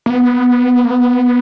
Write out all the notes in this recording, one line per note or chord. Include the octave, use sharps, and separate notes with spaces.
A#3
B3
A#3
B3